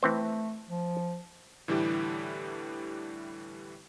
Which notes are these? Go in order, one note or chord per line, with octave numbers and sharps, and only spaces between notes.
E3 A3 C4 C5
F3
A2 D3 E3 G3 E4 G4